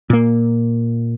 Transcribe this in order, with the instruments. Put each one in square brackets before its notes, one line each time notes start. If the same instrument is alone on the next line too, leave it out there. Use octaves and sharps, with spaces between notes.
[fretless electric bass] A#2 A#3